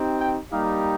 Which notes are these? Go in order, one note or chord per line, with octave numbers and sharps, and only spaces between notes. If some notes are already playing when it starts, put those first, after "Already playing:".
Already playing: C4 D#4 G4
G5
G3 A#3 D#4 G4 F5